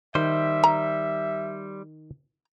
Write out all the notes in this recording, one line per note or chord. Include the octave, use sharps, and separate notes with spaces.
D#3 G3 C5 E5
A#5